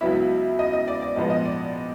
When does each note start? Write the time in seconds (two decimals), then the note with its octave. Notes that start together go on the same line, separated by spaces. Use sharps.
0.01 C#2 C#3 F#3 B3 E4 E5
0.59 D#5
0.73 D#5
0.88 D5
1.02 D5
1.16 A#1 G#2 F3 G#3 B3 D#5
1.30 D#5
1.45 D5